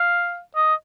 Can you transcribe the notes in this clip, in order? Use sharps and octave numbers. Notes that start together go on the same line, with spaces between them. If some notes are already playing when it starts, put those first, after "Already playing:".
Already playing: F5
D#5